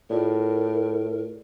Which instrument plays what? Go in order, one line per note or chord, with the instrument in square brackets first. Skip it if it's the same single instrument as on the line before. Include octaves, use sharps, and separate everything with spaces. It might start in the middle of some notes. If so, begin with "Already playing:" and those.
[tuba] A2 [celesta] F4 G#4 D5 [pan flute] A#4